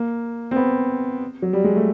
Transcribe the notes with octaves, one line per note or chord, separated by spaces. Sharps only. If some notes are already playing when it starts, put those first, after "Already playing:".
Already playing: A#3
C4
B3
F#3
G3
G#3
A3